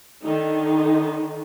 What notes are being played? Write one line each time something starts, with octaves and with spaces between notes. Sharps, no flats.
D3 D#3 D#4